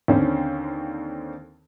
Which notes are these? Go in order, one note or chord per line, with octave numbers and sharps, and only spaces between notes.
D#2 D3 C4 C#4